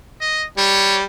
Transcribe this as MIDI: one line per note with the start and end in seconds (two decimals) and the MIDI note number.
0.21 0.44 75
0.58 1.04 55
0.58 0.96 73